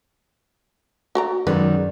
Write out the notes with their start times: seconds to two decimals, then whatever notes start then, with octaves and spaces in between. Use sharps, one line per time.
1.15 F#4 D5 A#5
1.47 F#2 D#3 F#3 G#3 B4 D5